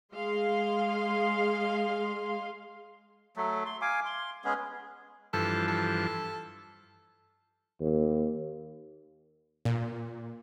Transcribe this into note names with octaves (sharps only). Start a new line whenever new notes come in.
G#3 G#4 F5 C6
F#3 A3
C6
F5 G#5 D6
C6
G#3 B3 C#4 G#4
G2 E3 F3 A4
A4
D#2
A#2